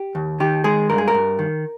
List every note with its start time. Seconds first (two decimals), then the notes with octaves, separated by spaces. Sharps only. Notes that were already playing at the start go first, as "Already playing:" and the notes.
Already playing: G4
0.15 D#2
0.40 D#3 G4
0.64 G#3 G#4
0.89 G2 A#4
0.98 G#4
1.08 A#4
1.14 G2
1.39 D#3